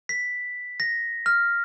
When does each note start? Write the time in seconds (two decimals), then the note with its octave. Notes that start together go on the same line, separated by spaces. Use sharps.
0.09 B6
0.80 A#6
1.26 F6